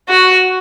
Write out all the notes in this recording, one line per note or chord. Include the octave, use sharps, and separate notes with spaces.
F#4